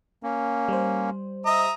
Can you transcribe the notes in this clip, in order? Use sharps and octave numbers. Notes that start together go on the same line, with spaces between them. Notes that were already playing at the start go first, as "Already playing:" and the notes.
A#3 C#4
G3 C5
D#5 E5 A#5 D#6